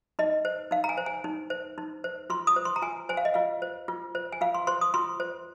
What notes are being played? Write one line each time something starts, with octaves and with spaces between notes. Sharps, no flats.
D#4 D#5
C5
D#4 F5
A#5
G#5
C5
G#5
D#4
C5
D#4
C5
F4 C6
D#6
C5
C6
A#5
F4 G#5
C5 G#5
F5
D#5
F4 F5
C5
F4
C5
G#5
F4 F5
C6
C5 C6
D#6
F4 C6
C5